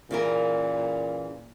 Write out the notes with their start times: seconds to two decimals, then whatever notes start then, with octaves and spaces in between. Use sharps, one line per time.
0.11 A#2 C#3 E3 A#4